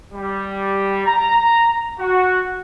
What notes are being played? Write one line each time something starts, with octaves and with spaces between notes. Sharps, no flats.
G3
A#5
F#4